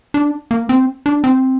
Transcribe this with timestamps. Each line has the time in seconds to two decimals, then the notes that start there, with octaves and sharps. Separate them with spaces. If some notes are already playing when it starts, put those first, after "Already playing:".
0.14 D4
0.51 A#3
0.69 C4
1.06 D4
1.24 C4